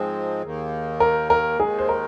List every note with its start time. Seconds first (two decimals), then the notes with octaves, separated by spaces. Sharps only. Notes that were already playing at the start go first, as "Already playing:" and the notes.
Already playing: G#2 F3 G#3 C4 G#4
0.42 D#2 D#3 A#3
1.00 A#4
1.30 A#4
1.60 D#2 D#3 G#3 G#4
1.79 C5
1.89 A#4